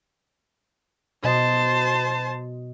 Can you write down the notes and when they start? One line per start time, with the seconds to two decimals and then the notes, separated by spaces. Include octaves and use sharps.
1.24 B2 C5 D#5 A5